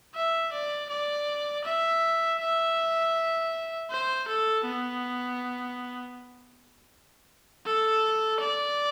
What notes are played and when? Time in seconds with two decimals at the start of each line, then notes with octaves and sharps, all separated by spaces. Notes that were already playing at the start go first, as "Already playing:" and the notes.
0.15 E5
0.53 D5
0.90 D5
1.64 E5
2.40 E5
3.91 C5
4.28 A4
4.65 B3
7.66 A4
8.41 D5